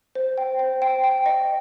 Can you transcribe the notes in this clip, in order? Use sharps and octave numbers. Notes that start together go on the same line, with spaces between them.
C5
G5
C5
G5
G5
D#5